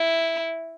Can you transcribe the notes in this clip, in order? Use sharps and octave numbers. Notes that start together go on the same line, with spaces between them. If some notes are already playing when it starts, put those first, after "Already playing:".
Already playing: E4